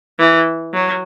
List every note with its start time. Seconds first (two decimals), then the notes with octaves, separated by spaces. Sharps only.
0.19 E3
0.74 F#3